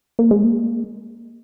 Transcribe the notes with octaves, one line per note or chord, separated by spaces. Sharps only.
A#3
G#3
A#3